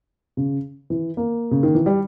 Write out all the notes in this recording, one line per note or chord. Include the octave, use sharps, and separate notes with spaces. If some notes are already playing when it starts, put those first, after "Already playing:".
C#3
E3
A#3
C#3
D#3
E3
G3